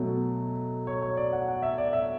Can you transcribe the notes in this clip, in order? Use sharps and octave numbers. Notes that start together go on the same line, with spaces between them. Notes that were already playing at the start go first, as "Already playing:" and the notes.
Already playing: B2 F#3 A3
C#5
C#5
D5
F#5
F#5
E5
D5
E5